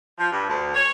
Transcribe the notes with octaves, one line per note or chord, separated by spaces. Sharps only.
F3
G2
D2
C#5